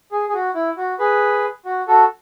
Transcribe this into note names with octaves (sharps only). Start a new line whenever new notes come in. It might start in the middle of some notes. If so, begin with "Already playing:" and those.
G#4
G#4
F#4
E4
F#4
G#4 B4
F#4
F#4 A4